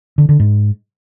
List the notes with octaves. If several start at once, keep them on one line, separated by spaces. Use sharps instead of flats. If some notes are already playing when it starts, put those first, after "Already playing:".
D3
D3
G#2